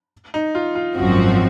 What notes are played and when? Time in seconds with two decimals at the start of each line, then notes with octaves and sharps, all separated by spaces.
0.34 D#4
0.55 F4
0.75 F4
0.97 G#1 F#2 F3 C4 F#4